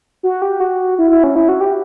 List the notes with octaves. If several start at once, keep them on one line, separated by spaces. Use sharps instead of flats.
F#4
G4
F#4
E4
E4
C#4
E4
F#4
G4